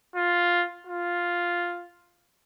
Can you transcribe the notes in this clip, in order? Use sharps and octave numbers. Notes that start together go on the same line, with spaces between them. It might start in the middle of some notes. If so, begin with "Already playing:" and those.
F4
F4